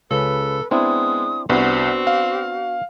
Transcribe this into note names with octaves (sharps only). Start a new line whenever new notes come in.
C#2 C#3 A4 B4
G#3 B3 C4 D4 E4 D#6
C2 B3 C4 D4 F#4
F5